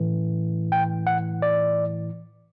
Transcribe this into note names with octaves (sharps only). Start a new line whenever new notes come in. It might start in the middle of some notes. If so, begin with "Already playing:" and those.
Already playing: A2 E3
G5
F#5
D5